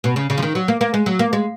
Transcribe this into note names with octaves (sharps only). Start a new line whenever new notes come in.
B2
C#3
C#3
F3
D#3
F#3
A#3
A#3
G#3
F#3
A#3
G#3